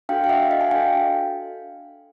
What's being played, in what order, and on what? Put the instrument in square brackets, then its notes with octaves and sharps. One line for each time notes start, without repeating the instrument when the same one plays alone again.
[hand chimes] D4 F#4 A4 F5 G5
F5
E5 F#5
D#5 F5
G#5
D4 F#4 A4 F5 G5